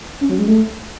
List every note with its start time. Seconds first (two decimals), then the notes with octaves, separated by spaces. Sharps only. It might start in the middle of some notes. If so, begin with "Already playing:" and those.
0.21 C#4
0.29 F#3
0.38 G#3
0.47 A3